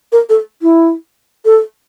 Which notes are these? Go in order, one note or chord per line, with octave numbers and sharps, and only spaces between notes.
A#4
A4
E4
A4